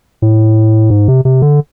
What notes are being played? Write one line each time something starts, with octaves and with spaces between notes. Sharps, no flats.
A2
G#2
C3
C3
D3